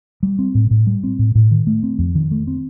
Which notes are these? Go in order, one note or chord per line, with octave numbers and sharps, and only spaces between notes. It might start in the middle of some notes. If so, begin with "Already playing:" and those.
G3
C4
A2
A2
G3
C4
A2
A2
D#3
A3
C4
F2
D#3
A3
C4